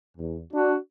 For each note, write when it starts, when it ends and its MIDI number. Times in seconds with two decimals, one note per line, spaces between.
0.18 0.40 40
0.53 0.75 62
0.53 0.77 66